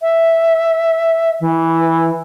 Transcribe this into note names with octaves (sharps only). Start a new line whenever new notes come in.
E5
E3